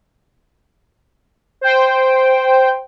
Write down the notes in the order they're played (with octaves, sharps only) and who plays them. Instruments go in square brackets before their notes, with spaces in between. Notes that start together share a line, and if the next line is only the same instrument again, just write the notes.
[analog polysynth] C5 G5